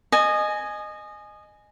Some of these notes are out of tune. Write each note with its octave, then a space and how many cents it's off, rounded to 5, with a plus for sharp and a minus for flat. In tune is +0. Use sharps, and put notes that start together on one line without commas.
D#5 -20 G#5 +10